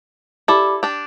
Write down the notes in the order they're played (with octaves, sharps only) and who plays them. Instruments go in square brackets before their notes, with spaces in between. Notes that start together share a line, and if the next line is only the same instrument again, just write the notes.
[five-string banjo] E4 A4 [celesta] G4 D5 B5 D6
[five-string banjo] D4 G4